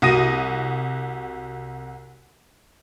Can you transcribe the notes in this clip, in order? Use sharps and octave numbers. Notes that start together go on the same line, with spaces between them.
C2 F#4 D#6 A#6 D#7